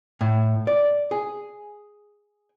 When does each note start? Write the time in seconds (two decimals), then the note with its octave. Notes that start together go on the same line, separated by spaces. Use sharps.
0.21 A2
0.67 D5
1.11 G#4